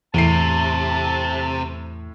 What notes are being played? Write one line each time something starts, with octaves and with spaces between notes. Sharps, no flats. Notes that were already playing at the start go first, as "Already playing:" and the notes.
E2 A2 C3 A5 C7